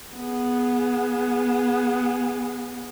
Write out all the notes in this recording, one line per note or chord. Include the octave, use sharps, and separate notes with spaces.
B3 G#4